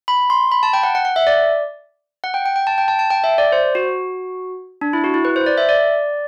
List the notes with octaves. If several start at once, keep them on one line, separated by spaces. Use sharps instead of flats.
B5
C6
B5
A5
G5
F#5
F#5
F#5
E5
D5
F#5
G5
G5
G5
A5
G5
A5
A5
G5
E5
D5
C5
F#4
D4
E4
F#4
E4
B4
C5
D5
E5
D5